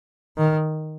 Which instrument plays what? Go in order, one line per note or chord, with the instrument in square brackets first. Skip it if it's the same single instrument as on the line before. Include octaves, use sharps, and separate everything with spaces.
[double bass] D#3